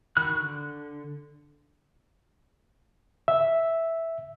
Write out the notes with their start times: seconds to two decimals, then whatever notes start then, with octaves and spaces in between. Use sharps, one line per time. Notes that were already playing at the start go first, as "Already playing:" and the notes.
0.17 D#3 F#4 B5 F#6
0.35 D3
3.28 E5